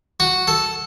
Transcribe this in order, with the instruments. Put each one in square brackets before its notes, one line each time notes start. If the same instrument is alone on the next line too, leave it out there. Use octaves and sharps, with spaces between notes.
[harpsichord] F#4
A4